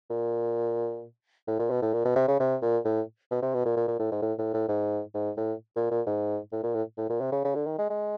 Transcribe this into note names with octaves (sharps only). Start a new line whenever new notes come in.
A#2
A2
A#2
B2
A2
A#2
B2
C3
C#3
C3
A#2
A2
B2
C3
B2
A#2
A#2
A#2
A2
G#2
A2
A2
A2
G#2
G#2
A2
A#2
A#2
G#2
A2
A#2
A2
A2
A#2
C3
C#3
C#3
D3
D#3
G#3
G#3